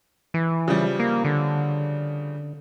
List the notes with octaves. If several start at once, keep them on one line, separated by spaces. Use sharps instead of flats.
E3
C#3 F3 G3
A#3
D3